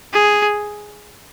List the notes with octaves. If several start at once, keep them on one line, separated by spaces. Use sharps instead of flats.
G#4